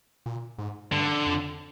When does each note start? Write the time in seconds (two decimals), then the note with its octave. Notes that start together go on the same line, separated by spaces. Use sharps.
0.26 A#2
0.58 G#2
0.92 G2 D3
1.26 F2